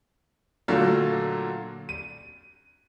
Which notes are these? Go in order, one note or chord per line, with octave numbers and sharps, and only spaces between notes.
A#2 D3 F#3 A3 A#3
D#7